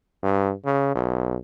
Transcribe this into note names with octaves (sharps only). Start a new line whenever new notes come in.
G2
C#3
B1